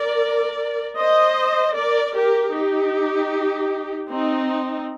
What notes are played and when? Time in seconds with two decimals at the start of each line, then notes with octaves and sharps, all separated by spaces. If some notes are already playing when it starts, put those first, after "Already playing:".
Already playing: A#4 D5
0.99 C5 D#5
1.76 A#4 D5
2.15 G4 A#4
2.54 D#4 G4
4.10 C4 D#4